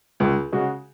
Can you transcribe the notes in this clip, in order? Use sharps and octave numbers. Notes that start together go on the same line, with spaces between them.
C#2
C#3 G#3 F#4